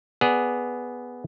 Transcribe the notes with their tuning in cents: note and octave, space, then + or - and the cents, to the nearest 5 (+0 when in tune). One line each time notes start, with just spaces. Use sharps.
B3 +0 G#4 +0 D5 +0